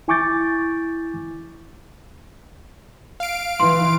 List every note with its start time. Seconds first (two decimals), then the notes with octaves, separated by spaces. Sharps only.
0.08 E4 G#5 C#6 D6 G6 A6
3.20 F5 D7
3.60 E3 C6